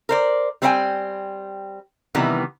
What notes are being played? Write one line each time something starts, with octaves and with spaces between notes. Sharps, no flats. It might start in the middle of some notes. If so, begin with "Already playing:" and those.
A#4 C5 D5
G3 C4 B4 C5 G5 G#5
C3 D#3 E3 G3 B3